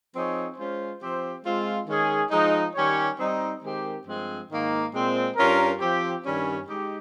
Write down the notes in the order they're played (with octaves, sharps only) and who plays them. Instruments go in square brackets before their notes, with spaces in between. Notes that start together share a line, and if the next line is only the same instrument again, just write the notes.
[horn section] F3 C4 D#4 G#4 C#5
G#3 C#4 F4 C5
F3 C4 G4 C5
G#3 C4 F4
D#3 G#3 C#4 G#4
F3 G#3 D#4
D#3 G3 C#4 G4 C#5
G3 C4 D#4
D#3 G#3 C4 G4 A#4
G2 F3 G#3 C4
G#2 D#3 A#3
A#2 G#3 C4
G2 G3 C#4 F4 A#4
F3 C4 G4
G2 D#3 G3 C#4
G#3 D#4 G4